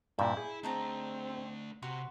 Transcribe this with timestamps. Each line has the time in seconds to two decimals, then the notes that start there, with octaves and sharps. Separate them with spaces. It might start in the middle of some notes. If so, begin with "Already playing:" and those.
0.19 G2 A#2 E4 E5 G5
0.37 G#4
0.63 A3 C4 D4 D#4 A5 A#5
1.82 C3 F#4 B4 A#5 C6